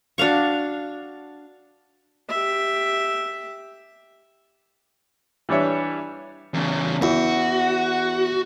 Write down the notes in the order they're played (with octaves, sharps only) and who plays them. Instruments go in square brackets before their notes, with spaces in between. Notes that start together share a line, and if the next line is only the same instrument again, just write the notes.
[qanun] D4 F#4 F5 C#6
[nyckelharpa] G4 E5
[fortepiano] E3 G3 D4 C#5 E5
[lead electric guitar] E2 C#3
[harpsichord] E2 [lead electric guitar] F#4